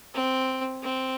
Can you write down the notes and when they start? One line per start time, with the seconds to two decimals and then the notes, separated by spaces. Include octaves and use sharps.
0.14 C4
0.83 C4